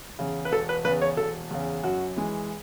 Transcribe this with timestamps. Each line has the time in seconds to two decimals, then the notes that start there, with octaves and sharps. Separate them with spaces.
0.19 E2 C#3
0.45 B4
0.51 E1 A4
0.69 B4
0.84 E2 C#3 B4
1.02 C#5
1.17 E1 A4
1.51 E2 C#3
1.83 F#2 F#4
2.16 E3 G#3